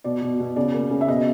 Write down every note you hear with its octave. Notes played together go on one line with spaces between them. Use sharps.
B2 D5
B2
B2
C#3 D5
A#3
C#3
E5
B2 D#5